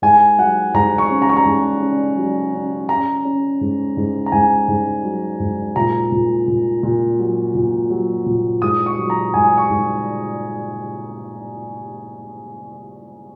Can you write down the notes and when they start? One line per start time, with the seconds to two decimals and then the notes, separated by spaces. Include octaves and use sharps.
0.02 G#2 G#5
0.38 F#3 F#5
0.74 G#2 A#5
0.98 C#6
1.10 C#4
1.22 A#5
1.29 C#6
1.37 A#5
1.45 G#2
1.81 C#4
2.17 F#3
2.53 C#4
2.89 C#4 A#5
3.25 C#4
3.61 G#2
3.97 G#2
4.26 A#5
4.32 G#2 G#5
4.68 G#2
5.04 F#3
5.40 G#2
5.76 A#2 A#5
6.12 A#2
6.47 A#2
6.83 A#2
7.19 F#3
7.55 A#2
7.90 F#3
8.26 A#2
8.62 G#2 D#6
8.86 C#6
8.98 F#3
9.10 A#5
9.34 G#2 G#5
9.58 C#6
9.70 G#2